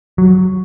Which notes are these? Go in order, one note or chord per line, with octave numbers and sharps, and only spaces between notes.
F#3